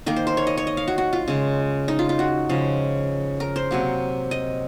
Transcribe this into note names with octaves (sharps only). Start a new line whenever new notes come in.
D#3 A#3 A#4
C5
C5
C#5
D#5
C#5
D#5
F5
F#4
F#4
F4
C#3 G#3
D#4
F4
F4
F#4
C#3 F3 G#3
A#4
C5
C3 F#3 A#3
D#5